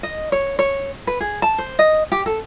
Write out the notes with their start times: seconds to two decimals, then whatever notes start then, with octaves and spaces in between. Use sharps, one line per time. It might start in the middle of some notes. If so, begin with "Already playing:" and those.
0.03 D#5
0.32 C#5
0.59 C#5
1.07 B4
1.20 G#4
1.42 A5
1.58 C5
1.79 D#5
2.12 G4
2.26 A4